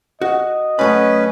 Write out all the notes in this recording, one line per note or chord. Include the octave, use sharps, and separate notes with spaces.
F#4 D#5
F#2 A3 C#4 B4 B5